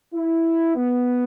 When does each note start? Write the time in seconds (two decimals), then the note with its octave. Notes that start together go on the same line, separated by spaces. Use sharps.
0.15 E4
0.76 B3